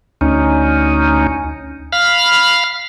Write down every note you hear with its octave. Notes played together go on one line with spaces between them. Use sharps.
D2 C#4 D#4
F5 B5 F6